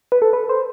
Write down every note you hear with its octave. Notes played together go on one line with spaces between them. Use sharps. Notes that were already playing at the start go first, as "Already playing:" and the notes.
B4
A4
B4
C5